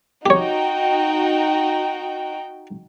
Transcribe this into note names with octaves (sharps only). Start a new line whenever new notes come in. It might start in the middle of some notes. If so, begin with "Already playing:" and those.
D#4 F#4 G4 C#5 G5